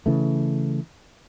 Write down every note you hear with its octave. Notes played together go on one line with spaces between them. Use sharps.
C#3 E3 A3